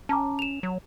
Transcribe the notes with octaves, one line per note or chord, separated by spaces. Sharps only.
C#4 A5 A#5 D6
E7 F7
F#3